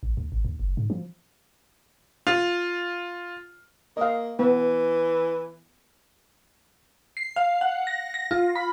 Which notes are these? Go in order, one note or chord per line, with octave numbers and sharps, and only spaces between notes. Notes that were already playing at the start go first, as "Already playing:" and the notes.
A1
D2
G#1
D#2
F#1
G#2
F3
F4
A#3 D#5 F5
E3 B3
C7
F5
F#5
A#6
A#6
F4
B5